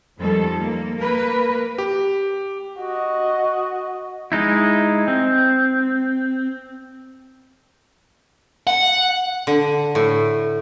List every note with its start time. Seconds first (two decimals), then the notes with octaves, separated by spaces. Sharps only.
0.19 F2 D#3 F3 G3 A4
0.60 A#3
0.96 A#3 A#4 B4
1.78 G4
2.79 F#4 D#5
4.32 G#3 D#4 E4
5.08 C4
8.67 F#5
9.47 D3
9.95 A2